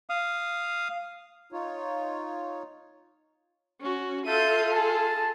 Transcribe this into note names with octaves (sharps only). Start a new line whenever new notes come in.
F5 D#6
D#4 F4 C#5
C#4 F#4
F4 A4 E5 F5 A5 G6 D#7
G#4 A5